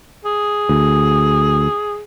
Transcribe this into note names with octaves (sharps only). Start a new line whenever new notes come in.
G#4
D2